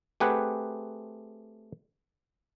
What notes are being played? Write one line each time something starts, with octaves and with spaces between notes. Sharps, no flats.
A3 C4 G4 G#4 B4 F#5